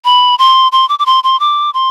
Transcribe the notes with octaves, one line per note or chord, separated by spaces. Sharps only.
B5
C6
C6
D6
D6
C6
C6
D6
C6